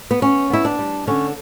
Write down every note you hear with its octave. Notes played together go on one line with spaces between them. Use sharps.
B3
B3 C#4
B3 E4
D4
G3
D3 C#4